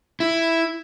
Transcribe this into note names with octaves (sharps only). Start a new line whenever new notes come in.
E4